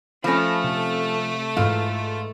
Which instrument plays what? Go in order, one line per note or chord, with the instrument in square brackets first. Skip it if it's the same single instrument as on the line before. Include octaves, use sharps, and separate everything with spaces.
[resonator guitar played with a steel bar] F3 C#4 [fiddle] A3 A4 [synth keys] B5 A#6
[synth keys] C3
[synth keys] G#2 E3 [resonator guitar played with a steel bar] F4